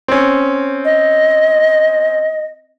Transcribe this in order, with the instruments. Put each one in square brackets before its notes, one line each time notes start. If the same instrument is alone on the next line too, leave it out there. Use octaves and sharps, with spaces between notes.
[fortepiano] C4 C#4
[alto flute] D#5